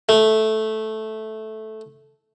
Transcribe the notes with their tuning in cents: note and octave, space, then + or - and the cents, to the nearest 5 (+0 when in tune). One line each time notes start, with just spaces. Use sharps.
A3 -10